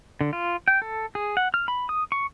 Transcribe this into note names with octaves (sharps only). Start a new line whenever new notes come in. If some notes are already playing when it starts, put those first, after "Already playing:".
D3
F4
G5
A4
G#4
F#5
F6
B5
D#6
C#6